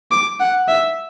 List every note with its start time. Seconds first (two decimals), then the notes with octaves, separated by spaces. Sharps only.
0.11 D6
0.40 F#5
0.69 E5